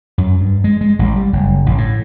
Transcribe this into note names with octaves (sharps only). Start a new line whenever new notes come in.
F#2
G2
G#3
G#3
A1
G3
F#1
A1
A2